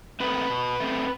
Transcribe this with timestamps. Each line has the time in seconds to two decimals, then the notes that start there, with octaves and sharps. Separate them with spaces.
0.20 A3 C4 B4
0.50 B2
0.80 A3 C4